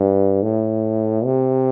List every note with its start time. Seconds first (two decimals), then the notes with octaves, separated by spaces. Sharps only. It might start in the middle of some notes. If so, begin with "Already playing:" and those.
Already playing: G2
0.42 A2
1.24 C3